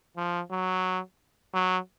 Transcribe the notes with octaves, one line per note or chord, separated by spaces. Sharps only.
F3
F#3
F#3